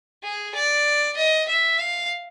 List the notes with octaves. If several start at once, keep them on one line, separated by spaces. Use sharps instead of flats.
G#4
D5
D#5
E5
F5